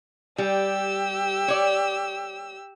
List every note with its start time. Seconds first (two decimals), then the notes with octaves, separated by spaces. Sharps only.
0.38 G3 G4 E6
1.48 C#5 D5